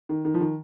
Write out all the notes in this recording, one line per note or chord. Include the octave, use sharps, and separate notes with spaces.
D#3
D#3
F3
D#3